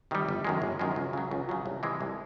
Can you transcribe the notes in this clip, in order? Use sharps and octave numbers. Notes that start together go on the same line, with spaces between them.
C3 D#3 G3
G1
F#2 D#3 G#3
G1
F#2 D#3 G#3
C#2
C#3 F#3
C#2
C#3 F#3
C2
C3 E3 G#3
C2